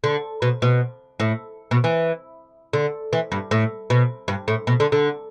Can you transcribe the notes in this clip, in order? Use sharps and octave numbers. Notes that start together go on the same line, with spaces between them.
D3
B2
B2
A2
B2
E3
D3
E3
G2
A2
B2
G2
A2
B2
D3
D3